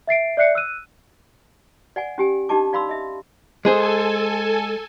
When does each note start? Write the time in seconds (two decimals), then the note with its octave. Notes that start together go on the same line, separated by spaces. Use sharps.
0.07 E5 A6 C7 D7
0.37 D5 E5 F#6 C7 C#7
0.55 E6 F#6 D#7
1.96 D5 F#5 G#5
2.18 C#4 G4 G#5
2.49 D4 D#4 G4 D#5 A5 D6
2.73 D5 F5 B5 C6 E6
2.89 D#5 E5
3.65 G#3 G#4 A4 C5 G#5